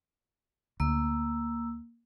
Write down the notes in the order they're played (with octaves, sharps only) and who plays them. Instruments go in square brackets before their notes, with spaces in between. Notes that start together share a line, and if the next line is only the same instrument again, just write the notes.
[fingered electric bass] D2 [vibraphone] A#3 E6